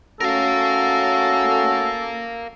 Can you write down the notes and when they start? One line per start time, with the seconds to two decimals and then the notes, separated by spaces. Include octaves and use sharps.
0.20 A3 C#4 F#4 A4 A#4 F5